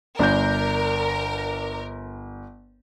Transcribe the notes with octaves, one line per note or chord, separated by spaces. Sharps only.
G1 D4 A#4 G6